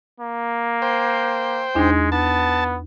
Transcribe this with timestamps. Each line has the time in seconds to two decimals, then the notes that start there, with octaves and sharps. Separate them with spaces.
0.20 A#3
0.82 C5 G5
1.75 E2 G#3 D4 D#4
2.12 B3 A5